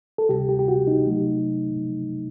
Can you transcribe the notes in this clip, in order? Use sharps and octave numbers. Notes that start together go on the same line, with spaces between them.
A4
D2 C3 G3 G4
G4
G4
F#4
D#4
C3 F#3 A3